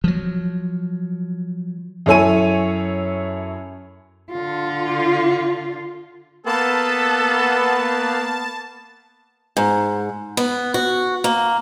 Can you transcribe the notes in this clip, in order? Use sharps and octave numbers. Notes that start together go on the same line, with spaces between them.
F3 F#3
F#2 E4 A4 C#5 G#5 D#7
D3 F4
A#3 B3 A4 A5
G#2
B3
F#4
A#3